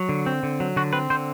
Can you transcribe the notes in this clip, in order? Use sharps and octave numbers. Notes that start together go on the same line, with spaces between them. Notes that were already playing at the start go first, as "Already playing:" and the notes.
Already playing: F#3
D3
C4
D3
F#3
D3 F#4
C4 B4
D3 C5